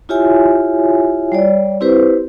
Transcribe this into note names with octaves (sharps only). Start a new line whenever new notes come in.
E4 F4 G4 C#5 E5 G#5
G3 C#5 D5
C4 E4 G4 B4 C5